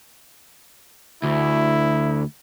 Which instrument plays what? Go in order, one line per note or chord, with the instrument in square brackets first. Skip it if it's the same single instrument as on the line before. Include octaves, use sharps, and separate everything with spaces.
[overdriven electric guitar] D2 [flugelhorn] E4